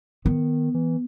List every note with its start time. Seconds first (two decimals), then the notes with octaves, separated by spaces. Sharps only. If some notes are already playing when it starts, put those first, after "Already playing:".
0.25 D#3 B3
0.74 E3